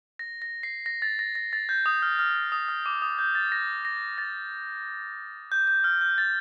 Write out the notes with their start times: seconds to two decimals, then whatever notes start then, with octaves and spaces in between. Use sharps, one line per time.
0.19 A#6
0.42 A#6
0.63 C7
0.86 A#6
1.02 A6
1.19 A#6
1.35 A#6
1.53 A6
1.69 G6
1.86 D#6
2.02 F6
2.19 F6
2.52 D#6
2.68 F6
2.86 D6
3.02 D#6
3.19 G6
3.35 A6
3.52 A#6
3.85 A#6
4.18 A6
5.52 G6
5.68 G6
5.84 F6
6.01 G6
6.18 A6